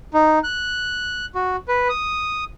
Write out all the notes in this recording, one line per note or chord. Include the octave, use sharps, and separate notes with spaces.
D#4
F#6
F#4
B4
D#6